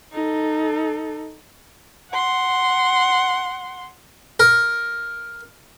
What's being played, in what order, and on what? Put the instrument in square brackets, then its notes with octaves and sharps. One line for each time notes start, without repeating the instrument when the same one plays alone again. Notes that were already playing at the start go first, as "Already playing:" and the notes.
[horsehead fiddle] D#4 A4
[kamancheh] F#5 C6
[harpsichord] A#4